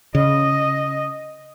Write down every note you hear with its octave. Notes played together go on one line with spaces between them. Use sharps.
C#3 D#5